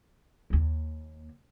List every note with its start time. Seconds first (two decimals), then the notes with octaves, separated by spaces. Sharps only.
0.50 D#2 A#3